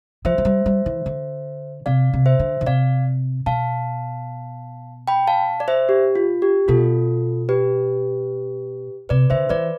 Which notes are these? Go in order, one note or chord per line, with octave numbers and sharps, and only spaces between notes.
F3 C5 E5
F3
G3
G3
E3
D3
C3 D5 F5
C3
C5 E5
D3
D3
C3 D5 F5
B2 F5 A5
G5 B5
F5 A5
D5
C5 E5
G4
F4
G4
B2 F4 A4
G4 B4
C3 B4 D5
D3 C5 E5
E3 B4 D5